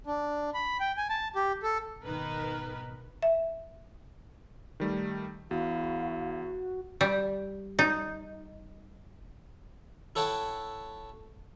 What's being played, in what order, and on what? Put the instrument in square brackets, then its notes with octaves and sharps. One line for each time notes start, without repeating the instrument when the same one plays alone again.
[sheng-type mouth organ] D4
B5
G5
G#5
A5
G4
A4
[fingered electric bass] G#1 B2 [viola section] D#3 B4 [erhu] A#4
[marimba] E5
[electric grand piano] D#3 G3 A3
[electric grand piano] E2 [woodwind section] E4 [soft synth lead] F#4 [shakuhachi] F5
[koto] G3
D#4
[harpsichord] E4 A4 C#5 F#5 G5 A5